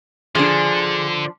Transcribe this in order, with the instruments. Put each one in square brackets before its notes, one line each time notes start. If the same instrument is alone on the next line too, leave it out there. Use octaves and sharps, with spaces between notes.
[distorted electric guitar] D3 [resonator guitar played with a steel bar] F3 D4 [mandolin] G#4